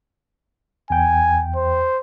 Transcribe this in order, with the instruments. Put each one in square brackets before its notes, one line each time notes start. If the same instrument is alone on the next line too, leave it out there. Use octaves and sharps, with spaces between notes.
[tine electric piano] E2 G5 [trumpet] G#5
[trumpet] C5